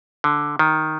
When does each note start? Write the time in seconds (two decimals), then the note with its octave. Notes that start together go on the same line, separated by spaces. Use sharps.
0.24 D3
0.59 D#3